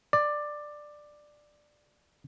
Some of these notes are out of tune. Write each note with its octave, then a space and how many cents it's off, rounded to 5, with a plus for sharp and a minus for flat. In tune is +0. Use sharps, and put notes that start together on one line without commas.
D5 +10